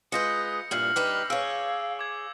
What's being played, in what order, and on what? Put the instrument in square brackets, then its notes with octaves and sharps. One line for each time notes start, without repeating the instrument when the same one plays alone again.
[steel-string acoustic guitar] G#3 F4 B4 [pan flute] D#6 [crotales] G6 A#6 C#7
[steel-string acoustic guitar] G2 A#2 E4 [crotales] E6 C7 F#7 [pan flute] F6
[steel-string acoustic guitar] G3 D#4 B4 [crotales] D6
[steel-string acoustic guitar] G#4 C#5 [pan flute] F5 [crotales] E6 D7
[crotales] D6 G#6